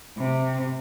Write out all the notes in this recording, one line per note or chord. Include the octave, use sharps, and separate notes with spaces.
C3